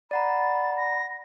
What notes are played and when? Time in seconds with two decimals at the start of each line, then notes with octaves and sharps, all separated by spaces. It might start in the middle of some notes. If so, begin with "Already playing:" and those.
0.11 D5 F#5 A#5 B5 A6
0.77 A#6